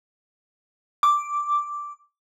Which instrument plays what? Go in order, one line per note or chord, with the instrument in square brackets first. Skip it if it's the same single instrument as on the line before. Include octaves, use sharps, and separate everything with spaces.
[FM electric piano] D6